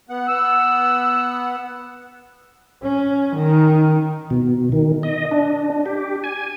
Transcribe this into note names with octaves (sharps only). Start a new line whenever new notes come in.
B3 F#5
B3 F#5 E6
C#4
D#3
B2
D#3
D#5
D4
G4
G#5